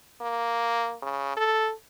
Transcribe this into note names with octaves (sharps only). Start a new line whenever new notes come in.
A#3
C#3
A4